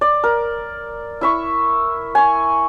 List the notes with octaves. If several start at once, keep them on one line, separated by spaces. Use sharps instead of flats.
D5
A#4
E4 E5 C#6
G#5 C#6